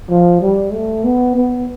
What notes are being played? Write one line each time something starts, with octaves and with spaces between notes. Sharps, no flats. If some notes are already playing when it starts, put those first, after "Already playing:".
F3
G3
A3
B3
B3